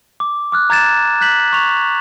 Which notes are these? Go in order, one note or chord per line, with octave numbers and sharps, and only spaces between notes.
D6
D6 F6 F#6
A#5 G#6 A6 E7
F#6 G6 B6 F#7
C#6 F7